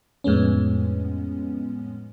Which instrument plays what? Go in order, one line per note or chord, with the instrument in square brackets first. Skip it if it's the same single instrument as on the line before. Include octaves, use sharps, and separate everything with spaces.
[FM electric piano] F2 A2 G#3 B3 C#4